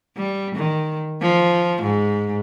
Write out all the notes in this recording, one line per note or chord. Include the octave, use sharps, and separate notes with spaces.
G3
D#3
F3
G#2